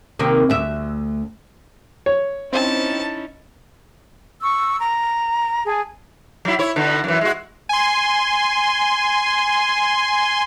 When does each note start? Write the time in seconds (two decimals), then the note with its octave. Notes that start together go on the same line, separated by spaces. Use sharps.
0.19 C3 D#3 A#3
0.50 D2 E5
2.06 C#5
2.53 C4 C#4 D#4 E4 A5
4.40 C#6 E6
4.79 A#5
5.65 G#4 G#5 A5
6.45 F#3 E4
6.59 E4 C#5
6.76 B2 D3
7.04 F#2 E3
7.21 G#3 F#4
7.69 G#5 C6